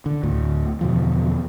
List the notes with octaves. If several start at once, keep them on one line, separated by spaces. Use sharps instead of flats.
D3
D2 A2
E2 B2 D3 F3